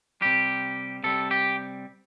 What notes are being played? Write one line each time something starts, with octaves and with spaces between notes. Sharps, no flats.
C3 G3 G4
C3 G3 A4
G4